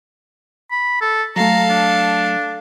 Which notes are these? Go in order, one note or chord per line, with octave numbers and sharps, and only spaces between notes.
B5
A4
F#3 A3 A4 F5 A#5
D4